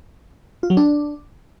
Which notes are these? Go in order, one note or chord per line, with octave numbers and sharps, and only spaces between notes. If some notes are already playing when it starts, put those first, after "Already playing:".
F4
F#3
D4